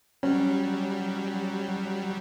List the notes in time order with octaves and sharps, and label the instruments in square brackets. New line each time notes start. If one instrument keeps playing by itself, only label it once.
[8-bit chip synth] F#3 G3 [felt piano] C#4